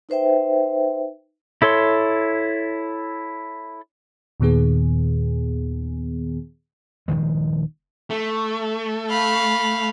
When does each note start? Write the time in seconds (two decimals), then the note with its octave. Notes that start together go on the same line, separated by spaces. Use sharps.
0.09 D#4 B4 C5 E5 G5
1.62 E4 A4 C#5 C6
4.40 D#2 A#2 D#3 B3 G#4
7.08 D#1 D#3 F3 G#3
8.10 A3
9.10 F5 B5